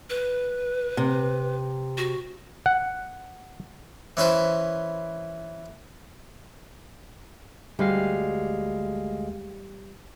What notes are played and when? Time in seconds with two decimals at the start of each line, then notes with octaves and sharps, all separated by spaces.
0.10 B4
0.97 C3
1.97 F#4
2.66 F#5
4.17 E3 C#4 B4 C5
7.79 D2 G3 G#3 F5